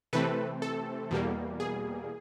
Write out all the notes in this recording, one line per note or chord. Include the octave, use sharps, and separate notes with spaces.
C3 E3 A3 C4 A4 B4
A4
E2 B2 G3 A#3
G#4